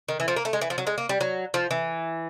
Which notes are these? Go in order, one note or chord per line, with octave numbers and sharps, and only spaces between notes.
D#3
E3
F3
A#3
A3
G#3
E3
F3
F#3
G#3
A#3
G3
F#3
F3
E3